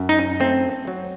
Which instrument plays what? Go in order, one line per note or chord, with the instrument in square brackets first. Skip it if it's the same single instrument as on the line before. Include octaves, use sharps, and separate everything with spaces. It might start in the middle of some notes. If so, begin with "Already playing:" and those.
Already playing: [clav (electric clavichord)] F#2
D#4
A3 C4
F#3